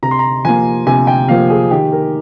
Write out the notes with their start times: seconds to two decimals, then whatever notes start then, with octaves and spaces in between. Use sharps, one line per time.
0.03 C3 A#5
0.11 C6
0.19 A#5
0.45 F3 A#3 G#5
0.87 C3 G#5
1.07 G5
1.28 F3 A#3 F5
1.50 G#4
1.70 D#3 G4
1.92 A#4